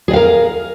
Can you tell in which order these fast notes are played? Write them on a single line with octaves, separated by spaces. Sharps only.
G#4 D#5 F5 A#4